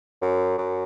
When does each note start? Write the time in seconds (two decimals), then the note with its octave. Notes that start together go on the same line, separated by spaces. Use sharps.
0.22 F#2
0.58 F#2